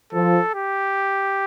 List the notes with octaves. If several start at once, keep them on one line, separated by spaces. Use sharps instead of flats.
F3 A4
G4